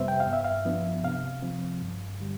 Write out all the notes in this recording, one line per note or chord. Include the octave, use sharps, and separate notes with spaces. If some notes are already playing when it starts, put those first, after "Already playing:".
Already playing: F2 C3 G3 B3 B4 C5 E5
G5
F5
G2
E5
F5
F3 B3 D4
C3 F5
F3 C4
G2
D3 G3